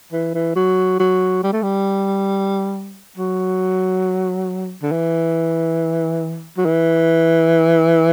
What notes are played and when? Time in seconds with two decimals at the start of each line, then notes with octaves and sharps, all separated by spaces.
0.12 E3
0.34 E3
0.56 F#3
1.00 F#3
1.43 G3
1.53 A3
1.62 G3
3.17 F#3
4.82 D3
4.91 E3
6.57 F#3
6.65 E3